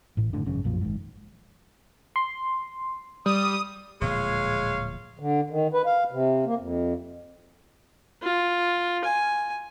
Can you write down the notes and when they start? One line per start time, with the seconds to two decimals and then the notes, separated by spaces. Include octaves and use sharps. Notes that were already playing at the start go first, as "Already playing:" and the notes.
0.17 A1 A2
0.33 F#1 A2 D3 D4
0.46 G#1 F#2 C#3 C#4
0.64 B1 F#2 A#2 F3
0.81 G#1 G#2
2.16 C6
3.26 G3 D#6
4.01 D1 A#2 F3 G#3 C#5 F5
5.19 D3
5.50 D#3
5.74 B4
5.86 F5
6.12 C3
6.46 A#3
6.58 F2
8.23 F4
9.05 G#5